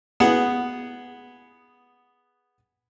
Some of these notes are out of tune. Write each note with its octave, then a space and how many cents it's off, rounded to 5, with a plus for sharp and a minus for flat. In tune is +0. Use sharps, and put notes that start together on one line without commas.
B3 +0 G#4 +0 F#5 +0